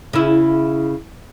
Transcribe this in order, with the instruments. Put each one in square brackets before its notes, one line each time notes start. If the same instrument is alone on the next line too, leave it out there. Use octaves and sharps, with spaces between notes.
[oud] C#3 E4